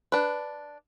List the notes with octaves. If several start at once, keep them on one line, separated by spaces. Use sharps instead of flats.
D4 B4